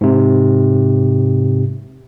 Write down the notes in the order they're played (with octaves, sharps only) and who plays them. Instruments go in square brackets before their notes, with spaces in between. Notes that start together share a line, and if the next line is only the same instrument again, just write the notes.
[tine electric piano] G#2 C3